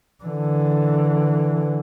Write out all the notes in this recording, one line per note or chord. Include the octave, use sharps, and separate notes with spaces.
D3 E3